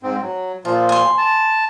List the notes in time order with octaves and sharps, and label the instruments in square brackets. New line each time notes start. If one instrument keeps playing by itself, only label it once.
[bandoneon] G#2 C4
F#3
[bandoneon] A#2 F3 [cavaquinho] F4
[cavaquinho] G#5 C6
[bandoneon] A5